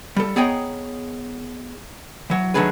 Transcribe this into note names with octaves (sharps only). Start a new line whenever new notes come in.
G3 A4
B3 G#4 C#5 D#5 G5 A#5
E3 F#3
D#3 F#3 A3 D4 G#4 B4